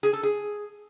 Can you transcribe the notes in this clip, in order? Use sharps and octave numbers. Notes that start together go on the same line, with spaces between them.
G#4
A4
G#4